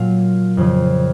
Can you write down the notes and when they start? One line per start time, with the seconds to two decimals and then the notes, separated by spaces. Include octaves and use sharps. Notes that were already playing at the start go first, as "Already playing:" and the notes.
Already playing: A#2 F#3 F5
0.57 F2 C#3 F3